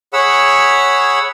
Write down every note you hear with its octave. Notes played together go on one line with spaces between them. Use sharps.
G#4 C#5 F#5 B5 E6